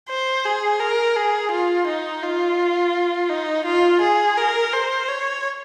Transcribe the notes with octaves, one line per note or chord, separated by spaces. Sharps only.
C5
G#4
A#4
G#4
F4
D#4
F4
D#4
F4
G#4
A#4
C5
C#5